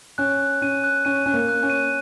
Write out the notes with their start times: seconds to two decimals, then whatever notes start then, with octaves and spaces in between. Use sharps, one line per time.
0.18 C#4 F#6
0.40 F#6
0.62 C#4 D#7
0.84 F#6
1.05 C#4 D#7
1.26 C#4 F#6
1.34 A#3
1.48 F#6
1.63 C#4
1.70 D#7